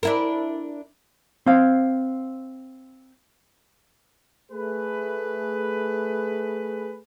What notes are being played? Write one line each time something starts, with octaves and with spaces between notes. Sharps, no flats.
D4 E4 A#4
C4 F5
A3 G#4 B4